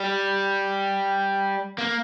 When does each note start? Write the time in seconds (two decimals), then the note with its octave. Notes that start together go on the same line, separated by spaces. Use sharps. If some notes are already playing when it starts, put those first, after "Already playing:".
Already playing: G3
1.78 A#3